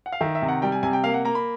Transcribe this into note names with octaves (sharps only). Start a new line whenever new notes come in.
F#5
F5
D#3 E5
E5
C3
F#5
G3 G5
G#5
C3 G#5
G5
A#3 F5
F#5
A#3 A#5
B5